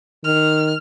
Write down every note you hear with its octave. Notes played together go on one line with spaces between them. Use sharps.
D#3 F6